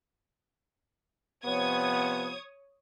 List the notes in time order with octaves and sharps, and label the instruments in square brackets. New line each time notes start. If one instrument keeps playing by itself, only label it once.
[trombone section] C3 F3 B3 [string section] C#5 D#6 G#6